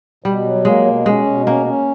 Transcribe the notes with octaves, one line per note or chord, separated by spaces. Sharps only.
B2 G3
F#3
G#3 A#3
B2
G#3 C#4
B2
A#3 C#4
C#4